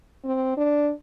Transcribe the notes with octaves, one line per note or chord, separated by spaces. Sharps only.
C4
D4